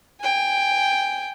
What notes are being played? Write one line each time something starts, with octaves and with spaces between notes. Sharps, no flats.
G5 G#5